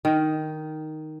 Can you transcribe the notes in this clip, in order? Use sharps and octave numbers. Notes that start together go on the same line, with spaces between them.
D#3